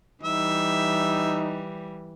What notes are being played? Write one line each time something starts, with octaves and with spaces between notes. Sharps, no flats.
E3 G3 D#4 E5